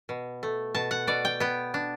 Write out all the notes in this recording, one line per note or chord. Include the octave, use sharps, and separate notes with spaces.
B2
A3
B2 A5
F#5
B2 D5
G5
B3 G5
D4